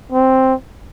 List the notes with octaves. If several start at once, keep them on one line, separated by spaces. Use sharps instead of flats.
C4